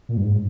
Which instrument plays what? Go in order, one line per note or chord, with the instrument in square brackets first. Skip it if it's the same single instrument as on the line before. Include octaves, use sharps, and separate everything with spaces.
[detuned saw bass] A#2
G2
G#2